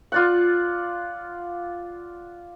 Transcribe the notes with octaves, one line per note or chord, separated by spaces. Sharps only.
F4 D5 F#5